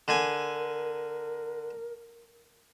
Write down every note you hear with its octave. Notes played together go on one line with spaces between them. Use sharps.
D3 A#4 G#5